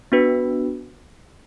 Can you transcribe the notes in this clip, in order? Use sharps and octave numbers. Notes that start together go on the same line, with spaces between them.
B3 D4 F#4 B4